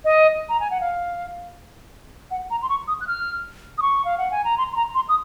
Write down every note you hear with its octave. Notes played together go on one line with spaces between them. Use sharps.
D#5
A#5
G#5
F#5
F5
F#5
A#5
C6
C#6
D#6
F#6
F6
D#6
C#6
F5
F#5
G#5
A#5
C6
C6
A#5
C6
D#6